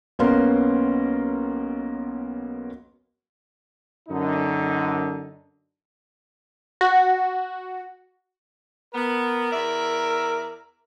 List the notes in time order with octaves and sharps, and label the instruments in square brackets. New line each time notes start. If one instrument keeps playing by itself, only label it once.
[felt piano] B1 A#3 B3 C#4 A#4 C6
[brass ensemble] F#2 D3 D#4
[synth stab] F#4
[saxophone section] B3 [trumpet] A#4
[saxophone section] E2 D5 E5